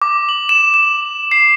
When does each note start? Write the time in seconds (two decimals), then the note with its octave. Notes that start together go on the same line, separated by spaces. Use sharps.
0.02 D6
0.29 F#7
0.49 E7
0.74 E7
1.31 C7